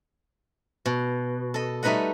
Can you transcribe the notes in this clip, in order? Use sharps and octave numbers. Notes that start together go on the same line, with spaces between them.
B2
A4 D#5
G3 A3 D#4 B4 D#5 F#5